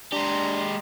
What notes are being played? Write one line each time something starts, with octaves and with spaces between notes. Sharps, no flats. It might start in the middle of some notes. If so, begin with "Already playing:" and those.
G#3 D4 G4 A#5 C6